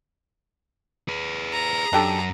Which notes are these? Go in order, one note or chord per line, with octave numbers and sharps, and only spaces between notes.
G#4 B4
A#5
F#2 D4 G4 A4